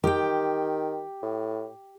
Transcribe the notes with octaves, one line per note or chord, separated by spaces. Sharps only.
D#3 G4 G5
A2